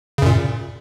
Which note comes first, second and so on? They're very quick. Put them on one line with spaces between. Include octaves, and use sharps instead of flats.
C#3 F#2 A#2